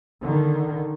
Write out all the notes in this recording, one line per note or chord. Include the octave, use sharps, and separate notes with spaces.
D3 D#3